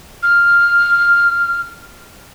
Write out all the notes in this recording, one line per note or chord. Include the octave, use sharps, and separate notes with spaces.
F6